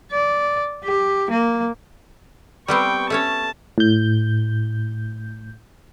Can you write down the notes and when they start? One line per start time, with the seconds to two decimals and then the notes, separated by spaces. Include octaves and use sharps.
0.12 D5
0.84 G4
1.30 A#3
2.68 G3 B3 C4 G5 C#6
3.10 A3 C#4 C#5 A5
3.78 A2 G6